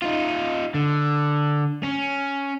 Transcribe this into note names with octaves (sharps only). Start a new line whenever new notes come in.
D#4 F4
D3
C#4